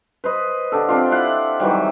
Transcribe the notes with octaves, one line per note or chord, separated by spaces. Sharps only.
B4 C5 D#5
D3 G4 A4
C4 D4 F4
E4 F5 F#5
D#3 E3 F#3 G3